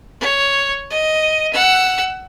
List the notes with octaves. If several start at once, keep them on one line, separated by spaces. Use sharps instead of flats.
C#5
D#5
F#5 E6